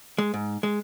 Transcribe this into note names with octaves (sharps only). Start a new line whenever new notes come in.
G#3
G#2
G#3